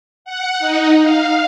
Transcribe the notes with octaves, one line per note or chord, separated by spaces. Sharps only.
F#5
D#4
F5